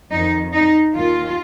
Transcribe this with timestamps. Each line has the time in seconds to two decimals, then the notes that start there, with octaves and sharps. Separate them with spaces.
0.11 F2 D#3 D#4
0.54 D#4
0.96 D#2 D#3 F4